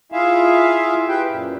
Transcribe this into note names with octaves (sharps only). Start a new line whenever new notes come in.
E4 F4 G#4 E5 F5
G4 B4 G5
F#2 A#2